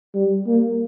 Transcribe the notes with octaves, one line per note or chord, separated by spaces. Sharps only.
G3
A#3